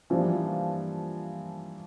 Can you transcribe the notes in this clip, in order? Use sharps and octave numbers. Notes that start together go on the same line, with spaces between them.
E3 F3 G3 A#3 D4 F4